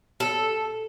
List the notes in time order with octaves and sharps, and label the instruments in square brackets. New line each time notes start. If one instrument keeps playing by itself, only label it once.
[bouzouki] A4